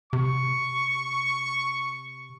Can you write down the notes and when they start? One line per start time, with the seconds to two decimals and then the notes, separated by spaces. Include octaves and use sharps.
0.13 C3 C#6